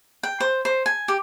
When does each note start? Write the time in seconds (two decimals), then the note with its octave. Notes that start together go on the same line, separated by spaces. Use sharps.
0.23 G5
0.40 C5
0.65 C5
0.86 G#5
1.08 G4